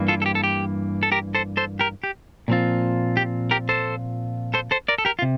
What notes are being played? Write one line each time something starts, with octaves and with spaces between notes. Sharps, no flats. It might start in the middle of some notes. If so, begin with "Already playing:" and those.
Already playing: G2 E3 A#3
F4 A4
A4
G4
A4
G4
A4
G4 A#4
A4 C5
A4 C5
G4 A#4
G4
A#2 F3 C4 F4
G4
G4 A#4
A4 C5
A4 C5
A4 C5
A#4 D5
A4
G4 A#4
F4
C3